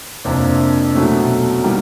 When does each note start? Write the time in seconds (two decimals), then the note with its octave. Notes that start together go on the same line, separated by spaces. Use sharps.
0.25 F2 C3 F3 A#3 D4
0.94 B2 F#3 A3 C#4
1.62 D#3 G3 A#3 D4 G4